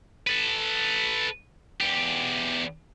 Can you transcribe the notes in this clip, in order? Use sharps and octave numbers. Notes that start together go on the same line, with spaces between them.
A4 B4
E2 G4